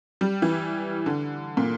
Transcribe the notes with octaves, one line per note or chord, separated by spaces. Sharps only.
G3
E3
D3
A#2